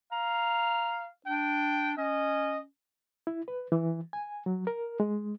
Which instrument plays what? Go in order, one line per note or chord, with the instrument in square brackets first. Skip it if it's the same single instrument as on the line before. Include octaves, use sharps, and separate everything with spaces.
[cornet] F5 [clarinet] A#5
[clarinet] D4 [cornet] G5
[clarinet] C#4 [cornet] D#5
[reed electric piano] E4
B4
E3
G#5
F#3
A#4
G#3